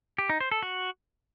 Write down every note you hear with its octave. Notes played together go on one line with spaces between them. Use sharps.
G4
D#4
C5
A4
F#4